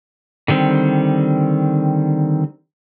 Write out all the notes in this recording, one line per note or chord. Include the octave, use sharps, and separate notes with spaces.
D3 D#3 G3 C4